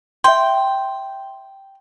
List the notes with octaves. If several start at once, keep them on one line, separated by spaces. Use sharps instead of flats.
E5 G5 C6